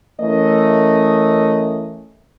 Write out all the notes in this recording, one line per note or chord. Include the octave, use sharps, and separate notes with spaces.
E3 A3 C#4 A#4 D#5